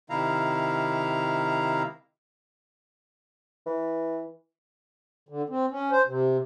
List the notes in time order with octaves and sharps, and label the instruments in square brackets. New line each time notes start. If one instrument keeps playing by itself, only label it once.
[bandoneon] C3 D#3 E4 F5 A#5
[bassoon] E3
[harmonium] D3
C4
C#4
C5
C3